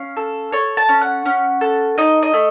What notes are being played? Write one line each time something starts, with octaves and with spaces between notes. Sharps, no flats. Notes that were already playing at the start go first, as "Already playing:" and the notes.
Already playing: C#4 F5
A4
A4 C#5
A5
C#4
F#5
C#4
A4
D#4 D#5
D#5
A3